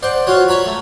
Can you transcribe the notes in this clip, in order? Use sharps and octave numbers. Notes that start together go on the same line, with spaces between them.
C5 D5 F#5
F4 F#4 C#5
C#5 A#5 B5
A3